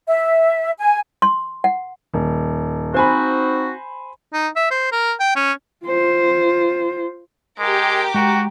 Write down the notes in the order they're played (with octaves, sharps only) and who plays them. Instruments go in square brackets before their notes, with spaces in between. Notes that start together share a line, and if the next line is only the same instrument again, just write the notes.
[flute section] E5
G#5
[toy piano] C6
F#5
[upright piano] D#1
[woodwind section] C4 D#4 F#4 [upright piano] C5 G#5 B5
[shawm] D#4
E5
C5
A#4
G5
C#4
[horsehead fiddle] F4 C5
[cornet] G#3 [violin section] G4 A#4 D6
[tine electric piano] G#3 G5 A#5 [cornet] F#4